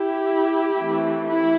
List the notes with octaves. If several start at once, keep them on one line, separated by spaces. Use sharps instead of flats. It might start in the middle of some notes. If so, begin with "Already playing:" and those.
Already playing: E4 G4
E3 A3 C4
E4